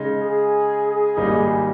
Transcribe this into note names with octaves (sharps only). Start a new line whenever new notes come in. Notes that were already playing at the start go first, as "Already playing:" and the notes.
Already playing: C#3 G#3 D#4
G#4
G#4
G#1 G#2 G3 A#3 D#4